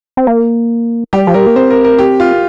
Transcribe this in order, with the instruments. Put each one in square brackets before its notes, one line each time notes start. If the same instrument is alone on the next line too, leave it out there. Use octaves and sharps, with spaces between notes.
[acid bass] C4
A#3
[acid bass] G3 [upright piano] G4
[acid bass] F3
[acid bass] G3 [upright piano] A#4
[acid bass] A#3
[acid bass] C4 [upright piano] C5
[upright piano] A#4
A#4
G4
F4